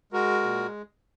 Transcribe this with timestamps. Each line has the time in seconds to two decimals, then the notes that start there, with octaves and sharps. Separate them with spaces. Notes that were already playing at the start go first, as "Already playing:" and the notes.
0.12 G#3 F#4 A#4
0.43 A#2